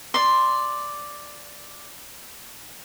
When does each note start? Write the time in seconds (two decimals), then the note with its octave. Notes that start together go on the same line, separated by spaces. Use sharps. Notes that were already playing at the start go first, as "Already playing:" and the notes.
0.14 D5 C6